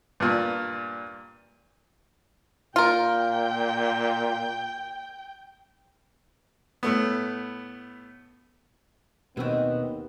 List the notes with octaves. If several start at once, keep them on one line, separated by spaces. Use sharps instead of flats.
G2 A#2
A#2 F4 A#4 G5
A2 A3 B3
D#2 B2 D#3 B3 C4 E4 F#4